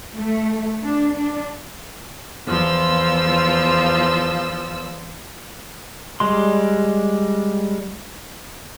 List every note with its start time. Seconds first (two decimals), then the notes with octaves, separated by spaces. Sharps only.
0.17 A3
0.83 D4
1.16 D4
2.47 E2 F3 F4 E6
6.20 G3 G#3 C6